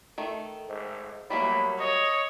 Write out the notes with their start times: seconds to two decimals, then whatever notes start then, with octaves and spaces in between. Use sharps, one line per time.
0.18 D#3 A3 A4
0.67 G#2
1.30 F#3 G3 A3 A#3 B5
1.80 C#5 D#5